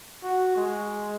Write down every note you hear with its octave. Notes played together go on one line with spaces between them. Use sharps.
F#4
G#3